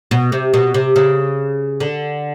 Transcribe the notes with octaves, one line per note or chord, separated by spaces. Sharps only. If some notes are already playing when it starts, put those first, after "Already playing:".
B2
C3
B2
C3
C#3
D3